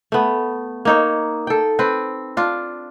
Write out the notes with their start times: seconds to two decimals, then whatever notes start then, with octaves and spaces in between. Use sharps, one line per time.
0.12 A3 B3
0.85 A#3 D#4 C#5
1.47 A4 G5
1.79 C4 B4
2.37 D4 F4